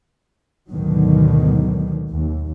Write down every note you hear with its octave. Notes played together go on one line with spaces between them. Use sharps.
D2 G#2 B2 D3 D#3 F#3
D#2